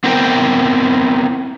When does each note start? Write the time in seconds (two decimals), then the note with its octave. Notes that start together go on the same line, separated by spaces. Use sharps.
0.04 B3 C4 E4 A#4 C5 G5